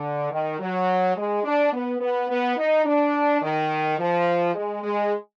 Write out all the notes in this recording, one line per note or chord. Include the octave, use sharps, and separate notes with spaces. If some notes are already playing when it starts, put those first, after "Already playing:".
Already playing: D3
D#3
F#3
G#3
D4
B3
B3
B3
D#4
D4
D#3
F3
G#3
G#3